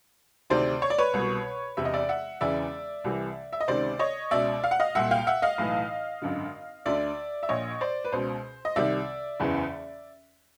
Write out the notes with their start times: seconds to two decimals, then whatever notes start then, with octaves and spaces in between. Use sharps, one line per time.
0.50 D2 C3 D#3 C5 D5
0.82 C#5
0.90 D5
0.98 B4 C#5
1.14 C2 B2
1.77 E1 E2 C3 E5
1.85 D#5
1.94 D5 E5
2.09 E5 F#5
2.41 E1 E2 C#3 E3 D5 E5
3.04 C2 C3 E3
3.53 E5
3.60 D#5
3.68 C#2 C3 D#3 C5 D5
3.99 C#5 D#5
4.31 C#2 B2 D5 E5
4.64 F5
4.71 F#5
4.80 D#5 F5
4.95 C2 A#2 E5 F#5
5.11 F5 G5
5.27 E5 F#5
5.42 D#5 F5
5.58 B1 A2 E3
6.22 G#1 F#2 D3
6.86 D2 D3 D5 E5
7.43 E5
7.49 A#1 A#2 C#5 D#5
7.81 C5 D5
8.04 B4
8.12 C#2 B2 C5
8.65 D#5
8.76 C2 C3 D#3 D5 E5
9.40 F#1 E2 C#3 E3